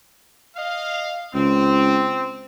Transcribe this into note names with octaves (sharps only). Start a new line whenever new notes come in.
D#5 F5
C#2 C4